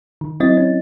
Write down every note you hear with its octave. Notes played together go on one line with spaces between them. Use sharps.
D#3
F#3 C4 E4 D#5 A6
C#4